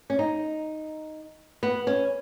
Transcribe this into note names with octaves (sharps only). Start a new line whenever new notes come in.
C#4
D#4
B3
C#4